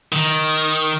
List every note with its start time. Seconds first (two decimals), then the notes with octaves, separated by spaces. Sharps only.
0.12 D#3